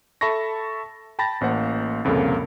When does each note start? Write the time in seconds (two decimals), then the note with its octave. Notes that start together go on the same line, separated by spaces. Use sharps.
0.21 A4 E5 A5 B5 C#6 A#6
1.19 G5 A5 B5 A6 A#6
1.41 A1 A#3 C5 F#5
2.05 C2 F2 A#2 C#3 A#3 A4